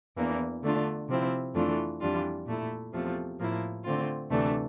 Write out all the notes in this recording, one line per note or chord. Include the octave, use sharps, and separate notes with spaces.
E2 E3 A#3 D4
D3 A3 D4 F4
C3 F3 C4 E4
F2 E3 A3 D4 F4
F2 E3 G3 D4 F4
A#2 A3 E4
E2 C3 F3 A3
A2 F3 A#3 E4
D3 A3 C4 F4
D2 C3 E3 A3 D4